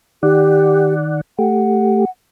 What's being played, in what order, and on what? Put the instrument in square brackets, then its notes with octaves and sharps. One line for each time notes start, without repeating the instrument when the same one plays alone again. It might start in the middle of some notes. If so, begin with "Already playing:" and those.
[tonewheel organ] D#3 D5 F#5 [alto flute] G4
[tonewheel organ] A3 G4 [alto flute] F#5